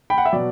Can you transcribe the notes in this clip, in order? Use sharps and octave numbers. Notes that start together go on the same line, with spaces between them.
G5 B5
F#5
E5
B2 F#3 D5